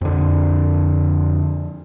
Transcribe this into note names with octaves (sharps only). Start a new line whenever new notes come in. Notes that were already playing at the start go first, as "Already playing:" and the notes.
F2 D3